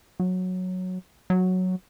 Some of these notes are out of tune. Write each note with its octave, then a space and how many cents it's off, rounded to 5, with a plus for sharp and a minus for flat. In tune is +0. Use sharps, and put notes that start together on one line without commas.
F#3 -10
F#3 -5